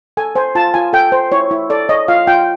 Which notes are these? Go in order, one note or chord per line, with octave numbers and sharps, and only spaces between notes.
A4 G#5
C5 G#5
F4 A5
F4 G#5
A4 G5
C5
E4 C#5
E4
A4 D5
C#5 D#5
F4 F5
F4 G5